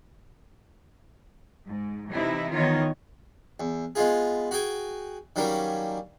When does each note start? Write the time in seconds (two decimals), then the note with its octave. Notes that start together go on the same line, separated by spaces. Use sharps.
1.65 G#2
2.10 C3 E3 D#4 E4
2.51 D#3 E3 B3 F4 C#5 D#5
3.60 E2
3.95 G#3 B3 F4 G#4
4.51 F#4 G#4 G5 G#5
5.36 D#3 F#3 G3 A#3 C#4